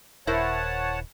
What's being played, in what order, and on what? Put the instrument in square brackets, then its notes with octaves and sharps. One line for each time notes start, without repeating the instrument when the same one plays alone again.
[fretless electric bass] D#1 [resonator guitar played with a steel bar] E4 A#4 C5 [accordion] C#5 F#5 A5